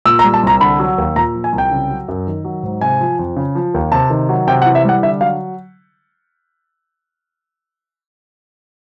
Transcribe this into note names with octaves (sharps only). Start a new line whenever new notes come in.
A#2 E6
A#5
G3
A5
C2 A#5
D3 B5
F#3
D#2
A#2 A#5
F3
G#5
C2
G5
C#3
F#3
F#2
D#3
F#3
G#2
C3 G#5
F3
F2
C#3
F3
D#2
C3 A5
D#3
F#3
C3 G5
F#5
E3
E5
G3 F#5
D3 E5
F#3 F5